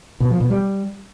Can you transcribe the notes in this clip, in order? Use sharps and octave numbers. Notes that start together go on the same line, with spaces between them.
B2
F3
B2
G3